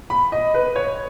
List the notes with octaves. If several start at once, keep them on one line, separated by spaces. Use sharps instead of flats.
B5
D#5
B4
C#5